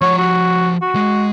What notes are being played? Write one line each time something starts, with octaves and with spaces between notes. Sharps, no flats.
F3 C#5 F#5
F#4
F#4
G#3